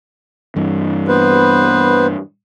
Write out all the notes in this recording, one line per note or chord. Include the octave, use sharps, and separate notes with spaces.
G2 E3
B3 B4 C5